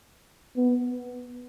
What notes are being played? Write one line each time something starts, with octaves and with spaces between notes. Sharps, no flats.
B3